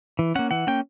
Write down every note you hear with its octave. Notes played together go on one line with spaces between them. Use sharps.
E3
A#3 C#4 F#5
E3 F#5
A#3 C#4 G5